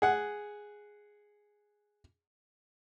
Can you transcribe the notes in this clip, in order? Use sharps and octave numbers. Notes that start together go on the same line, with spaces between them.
G#4 F#5